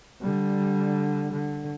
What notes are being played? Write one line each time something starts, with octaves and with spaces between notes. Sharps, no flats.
D3 G3
D3